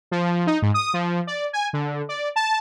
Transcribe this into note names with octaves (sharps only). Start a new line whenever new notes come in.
F3
D#4
G#2
D#6
F3
D5
G#5
D3
D5
A5